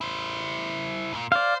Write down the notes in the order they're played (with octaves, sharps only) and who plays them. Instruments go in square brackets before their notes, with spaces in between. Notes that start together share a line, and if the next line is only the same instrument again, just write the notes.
[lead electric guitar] E4 C5
C#2 A#2
[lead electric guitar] C5 [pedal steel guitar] D5 F5